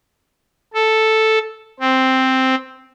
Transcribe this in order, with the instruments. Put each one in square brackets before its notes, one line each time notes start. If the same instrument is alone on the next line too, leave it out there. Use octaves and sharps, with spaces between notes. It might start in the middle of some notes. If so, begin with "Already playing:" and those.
[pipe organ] A4
C4